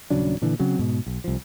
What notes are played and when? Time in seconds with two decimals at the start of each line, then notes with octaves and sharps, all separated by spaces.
0.10 D#1 C#3 F#3 D4
0.42 A#2 D3 E3
0.59 C#3 F#3 C4
0.79 G#2 B2
1.06 B1
1.24 C2 F3